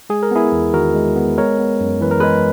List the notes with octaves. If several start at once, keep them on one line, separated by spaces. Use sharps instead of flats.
G#3 G#4
A#4
B3 E4 G#4
E2
D#3 F#4 A#4
G#3
B3
G#3 A#4 C#5
B3
F#2
E3 B4
A#4
G#3 G#4 B4